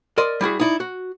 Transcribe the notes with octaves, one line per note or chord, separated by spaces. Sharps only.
A#4 D5 D#5 C6
G3 E4 F#4 G#4
D#4 E4 D5
F#4